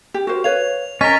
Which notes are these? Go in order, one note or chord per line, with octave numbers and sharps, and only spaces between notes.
G4
F#4 A#4 C5
B4 C#5 F5 F7
C#4 A#4 D#5 A6 B6 D#7